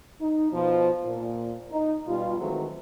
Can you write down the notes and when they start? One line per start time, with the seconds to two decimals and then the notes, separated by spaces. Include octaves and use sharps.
0.21 D#4
0.52 B2 F3
1.04 A#2
1.71 D#4
2.07 B2 G3 F4
2.39 D#3 E3 F#3 G#3 A3 C4